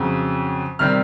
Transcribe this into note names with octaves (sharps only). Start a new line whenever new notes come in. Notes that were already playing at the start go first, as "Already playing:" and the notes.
Already playing: F2 C#3 F#3
C3 D#3 G3 C4 F6